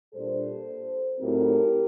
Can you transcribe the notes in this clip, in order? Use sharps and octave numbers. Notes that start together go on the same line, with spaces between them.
A#2 G3 D4 A4 C5
A2 F#3 C4 D#4 G4 A#4